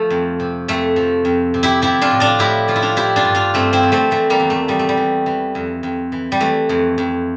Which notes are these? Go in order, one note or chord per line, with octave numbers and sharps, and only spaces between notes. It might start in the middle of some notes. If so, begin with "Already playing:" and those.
Already playing: F3 A3
F2
C3
F2 A3
F3
F2
C3
E4 G4
F3 E4 G4
D4 F4
A2
D4 F4
A2 E4 G4
F3 F4
E4
D4 F4
F3 E4 G4
D4 F4
G2
D4 F4
G2 A3 C4
C4 E4
F3
A3 C4
E3 A3
G3 A#3
E2
A3
E2 G3
A3
G3
E3
E3
F2
F2
E3
G3
E3 A3
F2
F2